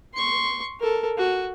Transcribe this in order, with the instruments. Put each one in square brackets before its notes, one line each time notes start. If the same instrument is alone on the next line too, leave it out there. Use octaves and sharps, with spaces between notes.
[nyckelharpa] C6 C#6
A4 A#4
F#4